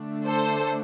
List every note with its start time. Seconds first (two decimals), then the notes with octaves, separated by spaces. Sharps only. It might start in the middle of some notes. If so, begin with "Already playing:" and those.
Already playing: D3 A3 D4
0.26 A4 C5